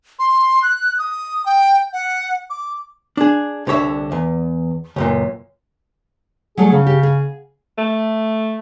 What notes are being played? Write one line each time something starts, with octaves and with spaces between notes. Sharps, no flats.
C6
F#6
D#6
G5
F#5
D6
D4 G#4
C2 D3 C#5 E5
E2
C#2 F#2 A#2
F#3 G3 A3 G#4
C#3 C#4
G4
G#4
A3